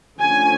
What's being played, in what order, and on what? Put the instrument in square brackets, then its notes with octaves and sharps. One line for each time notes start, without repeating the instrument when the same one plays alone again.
[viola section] D3 F3 A3 C#4 G#5